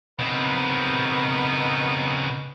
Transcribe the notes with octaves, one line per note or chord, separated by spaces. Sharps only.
C#3 B3 C4 D#4 A#4